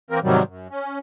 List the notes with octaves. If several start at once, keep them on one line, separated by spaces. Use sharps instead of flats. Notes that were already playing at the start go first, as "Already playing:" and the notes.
E3 A#3 C4 A#4
G#2 C3 D#3 F#3 G3
F#2
C#4